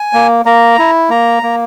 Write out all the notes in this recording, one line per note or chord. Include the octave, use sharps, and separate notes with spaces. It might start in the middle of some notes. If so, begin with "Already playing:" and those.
Already playing: G#5
A#3
A#3 A#5
E4
A#3 A#5
A#3